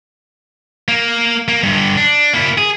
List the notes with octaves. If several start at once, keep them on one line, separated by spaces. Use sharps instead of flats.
A#3
A#3
G2 D3
D4
A#3 E4
G#4